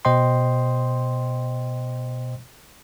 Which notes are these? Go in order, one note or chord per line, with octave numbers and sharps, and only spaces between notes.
B2 C5 D#5 G5 C6